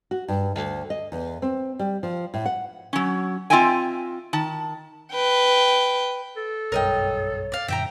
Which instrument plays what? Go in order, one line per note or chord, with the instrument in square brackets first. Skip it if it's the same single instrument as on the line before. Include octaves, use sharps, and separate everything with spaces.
[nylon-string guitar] F#4
G2
D2
D#5
E2
C4
G3
F3
A2
F#5
[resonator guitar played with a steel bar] F#3 C#4
C4 F4 D#5 E5 G5 G#5
D#3 A5
[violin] B4 G5
[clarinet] A4
[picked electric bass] F#1 B1 G2 [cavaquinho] A#4 D#5 G5 [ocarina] C#5
[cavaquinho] D5 F5
[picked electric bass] F#2 A#2 D3 [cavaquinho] E5 G5 A#5